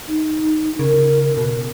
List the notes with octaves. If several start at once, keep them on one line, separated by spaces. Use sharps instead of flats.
D#4
C#3 A#4
B2